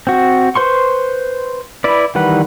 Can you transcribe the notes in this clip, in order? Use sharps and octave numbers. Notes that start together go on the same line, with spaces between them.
C4 F#4
B4 C5 C6 C#6
E4 B4 D5
D#3 E3 G3 B4 F#5